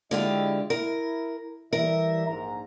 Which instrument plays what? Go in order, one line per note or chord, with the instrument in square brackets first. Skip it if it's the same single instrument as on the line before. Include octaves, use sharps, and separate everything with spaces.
[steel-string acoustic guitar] D3 F4 G4 [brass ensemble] G#3 E4 D#5
[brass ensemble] E4 [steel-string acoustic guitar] A#4
[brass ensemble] E3 G3 E5 [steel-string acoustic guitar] A#4
[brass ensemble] A#1 G#2 A#5